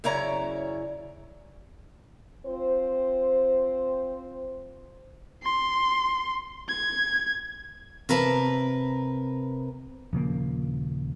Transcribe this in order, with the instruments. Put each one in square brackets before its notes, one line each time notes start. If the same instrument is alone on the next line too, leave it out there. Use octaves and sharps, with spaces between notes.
[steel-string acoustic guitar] F#2 C#3 E4 C#5 D5 A#5
[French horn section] C4 F4 C5
[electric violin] C6
G#6
[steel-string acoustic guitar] C3 A#4 B4 A5
[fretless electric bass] D#1 C#3 F3 A#3